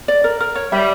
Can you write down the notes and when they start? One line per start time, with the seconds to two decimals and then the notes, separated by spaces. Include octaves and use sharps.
0.08 D5
0.24 A#4
0.40 A#4
0.55 C#5
0.72 G3 E5